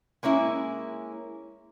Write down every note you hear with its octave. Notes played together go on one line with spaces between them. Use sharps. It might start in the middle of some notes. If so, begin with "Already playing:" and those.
G#3 A#3 C#4 E4